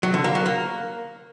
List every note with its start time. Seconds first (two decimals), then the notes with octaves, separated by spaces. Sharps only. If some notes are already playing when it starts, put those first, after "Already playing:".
0.03 F#3
0.14 D3
0.24 A#3
0.35 F#3
0.46 A#3